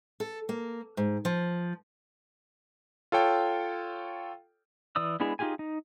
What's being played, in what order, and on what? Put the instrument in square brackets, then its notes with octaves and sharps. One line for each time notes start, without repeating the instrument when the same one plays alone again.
[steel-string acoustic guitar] A4
A#3
G#2
F3
[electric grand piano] F4 A4 C#5 G5
[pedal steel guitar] E3 D5 D#6 E6
G#3 B3 D4 E4 G#4
D#4 F4 G4 G#4 G#5
D#4